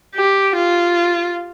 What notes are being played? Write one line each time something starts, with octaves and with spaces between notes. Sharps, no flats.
G4
F4